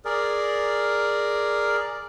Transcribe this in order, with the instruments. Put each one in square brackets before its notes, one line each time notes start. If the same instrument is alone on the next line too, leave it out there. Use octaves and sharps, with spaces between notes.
[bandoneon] G#4 A#4 D5